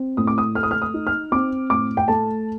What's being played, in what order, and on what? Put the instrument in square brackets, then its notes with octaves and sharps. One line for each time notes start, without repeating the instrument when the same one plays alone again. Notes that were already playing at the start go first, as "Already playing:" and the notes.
Already playing: [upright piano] C4
A2 D#6
D6
D#6
A3 F6
D#6
F6
D#6
D#4
F6
C4 D6
A2 D6
G5
A3 A5